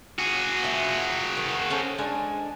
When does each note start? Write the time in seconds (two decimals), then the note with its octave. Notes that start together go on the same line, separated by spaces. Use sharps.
0.19 F#4 G#4
0.62 F3 E4
1.37 D#3
1.70 C#4 A4 C5
1.98 G#3 D4 G#5